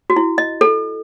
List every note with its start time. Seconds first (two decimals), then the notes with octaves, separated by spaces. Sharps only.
0.10 F#4
0.16 E4
0.38 D#5
0.61 A4